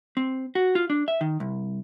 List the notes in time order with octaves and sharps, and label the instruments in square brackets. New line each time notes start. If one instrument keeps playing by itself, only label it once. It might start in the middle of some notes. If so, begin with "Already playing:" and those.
[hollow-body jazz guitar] C4
F#4
F4
D4
E5
D#3
C2